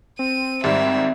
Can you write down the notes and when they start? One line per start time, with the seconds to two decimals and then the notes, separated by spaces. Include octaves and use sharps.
0.19 C4 D#7
0.64 G#1 G#2 G3 E5